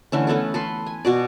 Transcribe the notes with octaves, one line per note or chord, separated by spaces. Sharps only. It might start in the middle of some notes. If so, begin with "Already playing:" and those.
D3 E3 A3 C#4
A3 B3 C#4 A4
A4 B4 C6
G#5
B2 F#4 D5